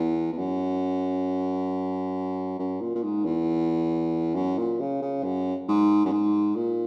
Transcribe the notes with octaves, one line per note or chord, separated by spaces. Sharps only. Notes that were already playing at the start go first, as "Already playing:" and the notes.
Already playing: E2
E2
F#2
F#2
A#2
A#2
G#2
E2
F#2
A#2
C#3
C#3
F#2
G#2
F#2
G#2
A#2